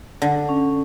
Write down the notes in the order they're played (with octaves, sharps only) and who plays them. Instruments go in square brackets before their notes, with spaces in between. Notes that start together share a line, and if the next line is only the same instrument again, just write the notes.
[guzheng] D3
[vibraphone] C#4